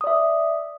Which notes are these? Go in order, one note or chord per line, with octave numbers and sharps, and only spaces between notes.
D5 E5 D#6